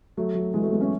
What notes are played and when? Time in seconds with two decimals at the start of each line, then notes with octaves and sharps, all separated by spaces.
0.17 F#3 A3
0.35 F#3
0.54 E3 G#3
0.62 F#3 A3
0.72 G#3 B3
0.81 A3 C#4